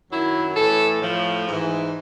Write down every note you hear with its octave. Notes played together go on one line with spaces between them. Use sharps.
F#2 D#3 F#3 E4
A2 E3 A4
A2 F3
G#2 E3